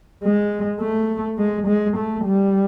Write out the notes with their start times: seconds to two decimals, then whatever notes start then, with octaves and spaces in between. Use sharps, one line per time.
0.23 G#3
0.81 A3
1.38 G#3
1.67 G#3
1.97 A3
2.25 G3